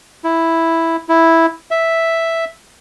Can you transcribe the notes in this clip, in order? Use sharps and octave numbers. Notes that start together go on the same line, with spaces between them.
E4
E4
E5